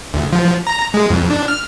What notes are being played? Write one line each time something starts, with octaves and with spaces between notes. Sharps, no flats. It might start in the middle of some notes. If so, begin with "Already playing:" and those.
D2
F3
A#5
G#3
F2
D4
F6